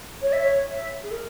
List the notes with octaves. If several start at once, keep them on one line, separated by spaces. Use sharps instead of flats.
C#5
E5
C#5
E5
G#4
A#4